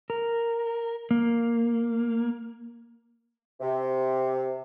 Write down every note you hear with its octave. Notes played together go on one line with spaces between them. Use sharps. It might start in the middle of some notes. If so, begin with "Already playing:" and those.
A#4
A#3
C3